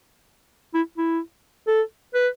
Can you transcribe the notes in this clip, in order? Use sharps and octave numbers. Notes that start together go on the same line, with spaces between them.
E4
E4
A4
B4